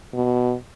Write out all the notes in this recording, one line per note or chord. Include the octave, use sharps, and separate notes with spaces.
B2